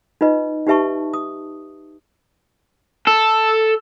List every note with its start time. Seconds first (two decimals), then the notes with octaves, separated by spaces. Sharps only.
0.21 D#4 F4 B4 D#5
0.67 D#4 G4 B4 E5 A5 C#6
1.13 D#6
3.07 A4